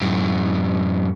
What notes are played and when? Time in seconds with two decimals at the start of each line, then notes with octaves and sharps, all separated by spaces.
0.02 F#2 A2